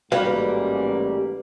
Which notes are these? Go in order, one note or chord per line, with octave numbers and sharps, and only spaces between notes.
A1 G#2 G3 A#3 F#4 B4 F5